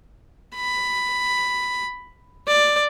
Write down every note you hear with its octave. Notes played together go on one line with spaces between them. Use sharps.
B5
D5